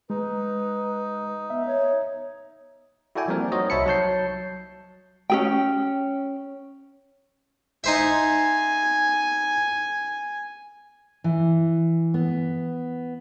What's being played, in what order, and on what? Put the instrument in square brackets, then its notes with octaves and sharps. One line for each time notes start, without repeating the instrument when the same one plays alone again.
[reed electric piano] G#3 [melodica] D#4 [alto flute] B4
[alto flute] B3 [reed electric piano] E5
[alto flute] C#5
[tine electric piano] E4 F#4 A4 D5 G5 G#5
F3 G3 A#3 C4 A#4 D5
D#4 F#4 C5 C#5 D#5
C2 C#5 E5 A5 B5 C#7
F#3 C#5 A5 G6 C7
[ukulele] C#4 G#4 G5
[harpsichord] D#4 C5 E5 [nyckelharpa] G#5
[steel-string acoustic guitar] E3
B3